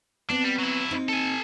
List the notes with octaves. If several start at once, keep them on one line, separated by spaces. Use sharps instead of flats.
B3 C4 D4
G3
F#3 E4
A#3 C4 D#4
A4 G#5